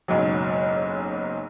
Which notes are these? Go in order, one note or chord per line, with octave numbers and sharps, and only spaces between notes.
F#1 B1 G#2 F#3